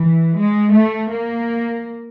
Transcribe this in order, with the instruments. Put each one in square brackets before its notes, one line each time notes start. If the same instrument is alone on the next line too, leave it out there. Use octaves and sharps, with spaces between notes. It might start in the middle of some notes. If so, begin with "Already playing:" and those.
Already playing: [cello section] E3
G#3
A3
A#3